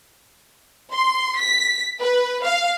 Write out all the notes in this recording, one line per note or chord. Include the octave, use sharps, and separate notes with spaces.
C6
B6
B4
F5